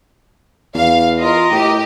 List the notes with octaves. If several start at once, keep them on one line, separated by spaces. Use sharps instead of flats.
E2 F5
F4 A#4 D#5
A2 G4